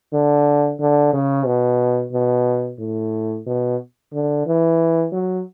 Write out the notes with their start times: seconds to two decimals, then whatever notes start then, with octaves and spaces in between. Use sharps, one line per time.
0.13 D3
0.80 D3
1.13 C#3
1.46 B2
2.13 B2
2.79 A2
3.46 B2
4.13 D3
4.46 E3
5.12 F#3